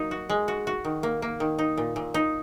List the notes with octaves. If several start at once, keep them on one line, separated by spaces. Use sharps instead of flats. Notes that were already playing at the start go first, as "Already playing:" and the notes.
Already playing: F#3 A#3 D#4
F#4
G#3
F#4
F#4
D#3
A#3
A#3
D#3
D#4
A#2
A#2
D#4